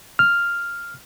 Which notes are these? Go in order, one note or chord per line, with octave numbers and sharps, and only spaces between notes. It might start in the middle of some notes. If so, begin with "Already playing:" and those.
F6